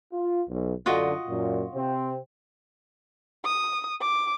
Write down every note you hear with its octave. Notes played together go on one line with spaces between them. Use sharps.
F4
B1
F#2 D3 F4 F#4 D#5
F#2 A#2
C3 C4
D#6
D6